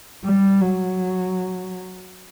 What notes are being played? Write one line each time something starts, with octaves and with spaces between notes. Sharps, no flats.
G3
F#3